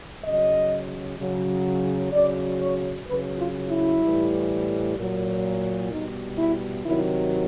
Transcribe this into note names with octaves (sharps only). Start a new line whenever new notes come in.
C#3 F#3 D#5
C#3 F#3
C#3 F#3 D5
C#5
C#3 F#3 B4
F4
E4
A2 E3 G3
A#2 F#3
B2 G3 D#4
E4
C3 D#3 F#3 E4